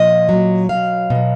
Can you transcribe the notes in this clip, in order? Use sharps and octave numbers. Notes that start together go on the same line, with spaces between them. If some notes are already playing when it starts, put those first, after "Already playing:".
Already playing: A#2 F3 D#5
A#2 F#3
B2 F#3 F5
B2 F#3